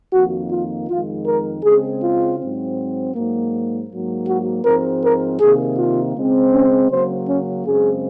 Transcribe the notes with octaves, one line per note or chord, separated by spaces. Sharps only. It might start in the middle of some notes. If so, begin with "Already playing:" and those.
F2 D#3 A#3 F#4
F4
F2 D#3 G#3 F4
A#4
C#3 G#3 C4 G#4
F4
G#2 F#3 C4
G#2 F#3 A#3
G#2 F#3 A#3
F#4
G#2 F3 G#3 C4 A#4
A#4
C3 D#3 A#3 G#4
F4
C#3 G#3 C4
C#4
C#3 F#3 A#3 C5
C#4
F#2 C#3 G#3 C4 G#4